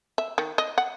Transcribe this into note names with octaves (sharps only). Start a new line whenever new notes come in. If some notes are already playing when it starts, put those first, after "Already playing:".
E5
D#3
D#5
F#5